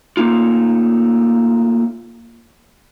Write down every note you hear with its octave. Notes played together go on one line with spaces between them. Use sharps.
A3 A#3 D#4 F4